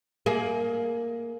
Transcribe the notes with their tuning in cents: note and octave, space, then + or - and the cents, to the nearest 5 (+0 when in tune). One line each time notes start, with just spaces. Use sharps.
A#3 +0 G#4 +30